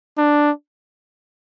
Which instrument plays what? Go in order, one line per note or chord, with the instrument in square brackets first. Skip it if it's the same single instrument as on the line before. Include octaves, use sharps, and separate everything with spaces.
[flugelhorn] D4